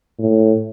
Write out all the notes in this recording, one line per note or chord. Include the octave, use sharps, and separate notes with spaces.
A2